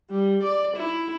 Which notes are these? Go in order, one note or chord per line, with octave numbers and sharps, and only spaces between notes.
G3
D5
E4